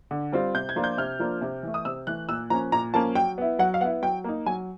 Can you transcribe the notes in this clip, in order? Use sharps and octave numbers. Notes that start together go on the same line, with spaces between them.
D3
G3 C4 F4
C3 G6
G#6
F3 A#3 D4 F4
G6
C3 F6
F3 A#3 D4 F4
C3
E3 A3
D#6
C3 E6
E3 A3 F#6
A#2 E6
F3 A#3 C#4 A#5
A#2 A#5
F3 A#3 C#4 A5
F#3 G5
B3 E4
F#3 F#5
F5
B3 E4 F#5
F#3 G5
A#3 D#4
F#3 G#5